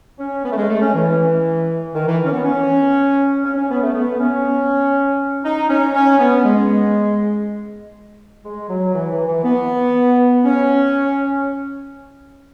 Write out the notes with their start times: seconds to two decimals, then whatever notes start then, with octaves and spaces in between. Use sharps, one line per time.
0.19 C#4
0.44 B3
0.51 A3
0.57 G#3
0.69 A3
0.82 C#4
0.94 E3
1.94 D#3
2.07 E3
2.25 C#4
2.32 B3
2.44 C#4
3.44 C#4
3.56 C#4
3.69 B3
3.82 A3
3.94 B3
4.19 C#4
5.44 D#4
5.69 C#4
5.94 C#4
6.19 B3
6.44 G#3
8.44 G#3
8.69 F#3
8.94 E3
9.11 E3
9.27 E3
9.44 B3
10.44 C#4